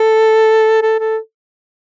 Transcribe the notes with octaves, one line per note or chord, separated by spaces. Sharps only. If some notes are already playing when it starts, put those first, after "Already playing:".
Already playing: A4
A4
A4